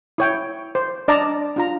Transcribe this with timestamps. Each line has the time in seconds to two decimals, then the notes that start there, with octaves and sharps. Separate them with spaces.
0.18 E4 C#5 G5
0.75 C5
1.08 D4 D5 D#5 A5 A#5
1.56 D4 F4 A#5